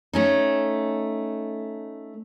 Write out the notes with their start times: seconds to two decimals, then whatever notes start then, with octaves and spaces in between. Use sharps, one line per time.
0.13 A3 C#4 D#4